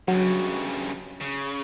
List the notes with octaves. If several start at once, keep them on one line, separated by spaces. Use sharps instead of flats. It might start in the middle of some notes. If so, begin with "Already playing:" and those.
G2 C#3 F#3
C#3